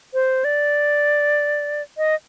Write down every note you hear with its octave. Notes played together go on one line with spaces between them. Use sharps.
C5
D5
D#5